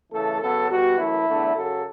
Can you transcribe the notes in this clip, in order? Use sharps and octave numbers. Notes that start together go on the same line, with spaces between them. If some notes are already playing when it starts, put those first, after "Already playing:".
C#3 E3 A3 A4
C#3 F#3 B3 A4
B2 G3 B3 F#4
F#2 E3 A3 E4
E2 D3 A3
F#2 C#3 F#3 A4